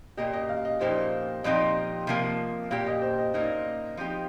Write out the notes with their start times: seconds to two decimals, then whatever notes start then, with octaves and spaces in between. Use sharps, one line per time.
0.17 A#2 A#3 G4 D#5
0.33 D#5
0.49 F5
0.65 D#5
0.81 A#2 F3 A#3 D#4 G4 C5
1.44 A#2 F3 C4 D#4 G4 D#5
2.07 C3 F3 A#3
2.70 A#2 A#3 G4 F5
2.87 D#5
3.02 C5
3.18 D#5
3.34 A#2 A#3 D#4 D#5
3.97 F3 C4 D#4 G4